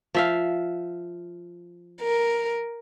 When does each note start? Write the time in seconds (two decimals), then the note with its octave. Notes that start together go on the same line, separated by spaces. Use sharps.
0.14 F3 E5 F5
2.01 A#4